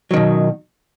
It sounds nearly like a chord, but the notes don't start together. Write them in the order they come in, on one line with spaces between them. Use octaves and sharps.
F#3 D#3 B2